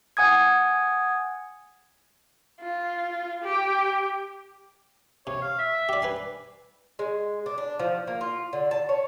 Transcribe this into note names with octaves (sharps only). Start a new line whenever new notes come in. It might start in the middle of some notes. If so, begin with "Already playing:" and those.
F#5 G#5 D#6 G#6
F4
G4
C3 C#5
F5
E5
G4 D5
B4 G#5 C6
G#3
D4
D4
F3
A#3
F4
D3
A5
C#5